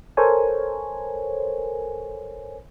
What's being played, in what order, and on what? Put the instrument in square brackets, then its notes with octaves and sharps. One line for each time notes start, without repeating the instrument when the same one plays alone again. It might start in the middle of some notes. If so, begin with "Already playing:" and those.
[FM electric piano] A4 A#4 C5 C#5 G#5